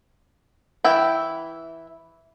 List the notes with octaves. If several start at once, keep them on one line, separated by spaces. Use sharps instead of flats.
E3 E4 E5 G5 B5